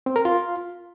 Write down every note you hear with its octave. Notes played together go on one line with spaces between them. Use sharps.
C4
A#4
F4